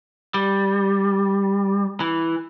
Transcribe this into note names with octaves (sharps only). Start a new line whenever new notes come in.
G3
E3